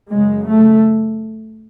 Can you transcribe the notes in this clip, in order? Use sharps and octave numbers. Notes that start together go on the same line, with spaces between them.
F#2 C#3 G#3
A3